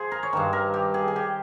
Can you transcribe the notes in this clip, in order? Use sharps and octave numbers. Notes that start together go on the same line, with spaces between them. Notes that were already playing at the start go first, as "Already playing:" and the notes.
Already playing: F3 G#4 C5
A#4
C#5
G2 D#3 C5
A#4
G4
G#4
G#4
G4